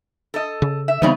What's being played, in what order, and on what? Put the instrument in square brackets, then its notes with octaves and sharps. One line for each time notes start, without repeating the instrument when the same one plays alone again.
[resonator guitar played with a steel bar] A4 D#5
[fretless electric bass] C#3
[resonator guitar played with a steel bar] E5
[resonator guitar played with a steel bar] C#3 B3 D#4 [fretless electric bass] E3 G3 C4